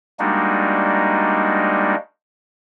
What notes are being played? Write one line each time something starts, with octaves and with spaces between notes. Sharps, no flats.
G3 G#3 A#3 D4 D#4 F#4